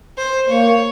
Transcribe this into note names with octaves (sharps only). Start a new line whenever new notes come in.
C5
A#3 C#5